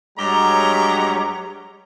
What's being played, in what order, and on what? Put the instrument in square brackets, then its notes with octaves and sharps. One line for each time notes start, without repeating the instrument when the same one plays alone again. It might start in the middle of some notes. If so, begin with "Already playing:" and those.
[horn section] G2 F#3 G#3 G4 C#5 A#5